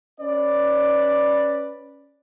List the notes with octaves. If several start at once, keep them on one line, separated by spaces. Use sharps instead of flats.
C#4 B4 D5